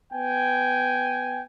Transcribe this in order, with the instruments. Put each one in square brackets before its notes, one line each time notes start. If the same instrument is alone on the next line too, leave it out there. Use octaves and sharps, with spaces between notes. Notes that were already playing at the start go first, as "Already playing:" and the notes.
[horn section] B3 G5 G#5